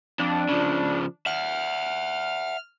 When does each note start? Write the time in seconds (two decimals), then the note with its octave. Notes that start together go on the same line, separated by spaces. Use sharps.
0.19 F2 D4
0.48 C#3 F3
1.26 E5 F#5 F6